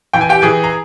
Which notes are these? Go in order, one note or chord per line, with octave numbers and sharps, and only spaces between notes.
E3 G5
G#5
G4 G5
E3 G#4 G#5
A#5